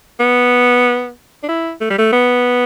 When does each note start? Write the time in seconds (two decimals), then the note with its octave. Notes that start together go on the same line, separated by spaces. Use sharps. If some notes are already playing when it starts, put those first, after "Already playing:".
0.20 B3
1.43 D4
1.49 E4
1.81 A3
1.90 G3
1.98 A3
2.13 B3